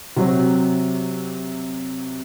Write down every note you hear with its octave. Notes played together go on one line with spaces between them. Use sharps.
C3 F#3 C4